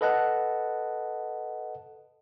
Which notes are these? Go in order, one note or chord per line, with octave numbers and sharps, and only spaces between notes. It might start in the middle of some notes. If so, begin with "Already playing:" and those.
A4 B4 D#5 F#5 A5 F#6